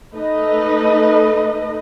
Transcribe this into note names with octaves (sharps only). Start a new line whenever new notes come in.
A3 D#4 A4 B4 D#5